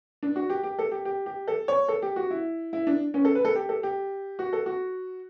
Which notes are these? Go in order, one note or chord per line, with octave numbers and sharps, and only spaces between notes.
D4
F#4
G4
G4
A4
G4
G4
G4
A4
C#5
A4
G4
F#4
E4
E4
D4
C#4
A4
B4
A4
G4
A4
G4
F#4
A4
F#4